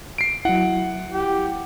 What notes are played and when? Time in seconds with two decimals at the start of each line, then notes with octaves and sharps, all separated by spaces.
0.18 C7 D7
0.45 F#3 E4 F#5
1.13 G4